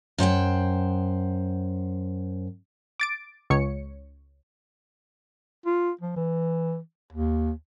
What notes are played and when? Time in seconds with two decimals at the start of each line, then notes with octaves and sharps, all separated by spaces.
0.18 F#2 C5 F#5 G5
3.00 D6 A6 D7
3.50 C#2 C#5 C#7
5.66 F4
6.01 F3
6.16 E3
7.12 D#2